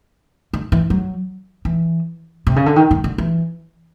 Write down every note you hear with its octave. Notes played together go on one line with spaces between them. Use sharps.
D3
E3
F#3
E3
C3
C#3
D3
D#3
D#3
D3
E3